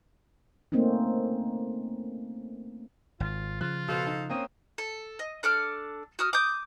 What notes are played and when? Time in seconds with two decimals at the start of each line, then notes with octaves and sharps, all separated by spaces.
0.72 A3 A#3 C4 C#4 D#4
3.20 G#1 F4
3.61 C#3 F3 F4 F#6
3.88 B2 A4 C5 F5
4.07 D#4
4.29 A#3 C4 C#4 D#6
4.78 A4
5.19 D#5
5.43 D4 A4 D6 F6
6.19 F#4 D#6 F6
6.33 D6 D#6 G6